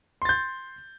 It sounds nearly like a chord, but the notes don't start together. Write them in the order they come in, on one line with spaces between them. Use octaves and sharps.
C6 A6 G6